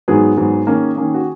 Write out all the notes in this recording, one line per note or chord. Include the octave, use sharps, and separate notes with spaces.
G#2 F#3 B3 G#4
G#2 F#3 B3
D#3 A#3 C#4
D#3 A#3 C#4
F#4